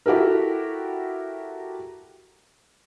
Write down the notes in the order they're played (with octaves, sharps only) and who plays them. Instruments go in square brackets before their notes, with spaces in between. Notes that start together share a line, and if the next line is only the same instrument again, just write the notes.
[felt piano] E4 F#4 G4 A4 A#4